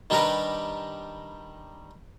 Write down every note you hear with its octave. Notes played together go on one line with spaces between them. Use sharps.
D#3 G3 D4 G4 A#4 B4